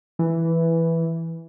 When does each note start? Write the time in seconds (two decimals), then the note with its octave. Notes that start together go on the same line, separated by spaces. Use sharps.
0.19 E3